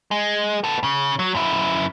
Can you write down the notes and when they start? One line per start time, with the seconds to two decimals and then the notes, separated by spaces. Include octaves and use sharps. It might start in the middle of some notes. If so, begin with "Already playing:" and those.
0.11 G#3
0.64 B3 A4
0.84 C#3
1.19 F#3
1.35 F#2 E4